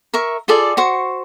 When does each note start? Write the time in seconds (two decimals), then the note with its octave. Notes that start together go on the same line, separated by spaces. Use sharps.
0.14 A#4 E5 C#6
0.48 F4 G#4 A4 D5
0.77 F#4 C5 C#6